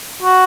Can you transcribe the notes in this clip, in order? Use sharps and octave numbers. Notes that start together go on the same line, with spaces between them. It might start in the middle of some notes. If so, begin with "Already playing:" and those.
F#4